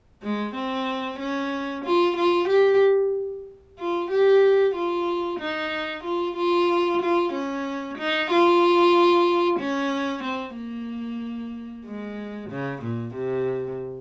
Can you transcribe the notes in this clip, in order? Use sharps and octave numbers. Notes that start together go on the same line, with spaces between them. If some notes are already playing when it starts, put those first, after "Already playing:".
G#3
C4
C#4
F4
F4
G4
F4
G4
F4
D#4
F4
F4
F4
C#4
D#4
F4
C#4
C4
A#3
G#3
C#3
A#2
C3